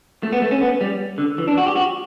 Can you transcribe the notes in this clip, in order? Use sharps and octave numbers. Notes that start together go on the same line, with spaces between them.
A3
B3
A3
C#4
B3
G3
D3
E3
D4
F#4
G4
F#4